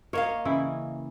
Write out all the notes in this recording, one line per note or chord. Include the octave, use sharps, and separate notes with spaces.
A#3 A#4 C#5 D#5 F5
C#3 E3 E4